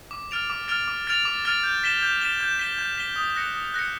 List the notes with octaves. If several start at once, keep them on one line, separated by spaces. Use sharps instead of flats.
D6
F6 A6 D7 F7
D6
F6 A6 D7 F7
D6
F6 A6 D7 F7
D6
F6 A6 D7 F7
G6
B6 E7 G7
G6
B6 E7 G7
G6
B6 E7 G7
G6
B6 E7 G7
D#6
F#6 A#6 C#7
D#6
F#6 A#6 C#7